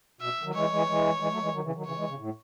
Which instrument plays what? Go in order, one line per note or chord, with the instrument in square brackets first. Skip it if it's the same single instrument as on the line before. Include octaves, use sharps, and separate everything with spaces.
[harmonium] B2 [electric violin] E5
[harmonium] D#3 F#3
[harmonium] E3 G#3 [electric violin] C#5
[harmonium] E3 G#3
E3 G#3
E3 G#3
F#3 A3
E3 G#3
D#3 F#3
C#3 E3
D#3 F#3
[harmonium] C#3 E3 [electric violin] C#5
[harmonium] E3 G#3
C#3
A2